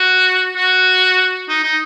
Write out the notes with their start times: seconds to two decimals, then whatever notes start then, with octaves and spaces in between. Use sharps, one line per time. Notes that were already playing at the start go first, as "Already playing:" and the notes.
Already playing: F#4
0.56 F#4
1.49 D#4
1.63 D#4